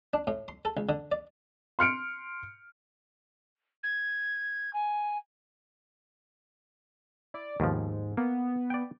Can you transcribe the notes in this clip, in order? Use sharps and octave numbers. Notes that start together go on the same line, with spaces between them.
D4
A2
C6
A4
C#2
D3
D5
C6 F6 C#7 D7
G#6
G#5
E4 D5
D#2 G#2 B2 F3
A#3 B3
D5 G5